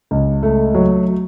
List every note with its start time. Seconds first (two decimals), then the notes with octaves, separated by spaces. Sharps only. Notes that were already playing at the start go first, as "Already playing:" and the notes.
0.11 C#2
0.43 A3
0.74 F#3